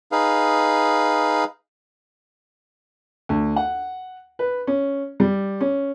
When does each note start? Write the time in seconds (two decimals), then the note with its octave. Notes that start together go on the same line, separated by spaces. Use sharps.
0.12 D#4 G#4 B4 F5
3.29 D2
3.56 F#5
4.39 B4
4.67 C#4
5.20 G3
5.61 C#4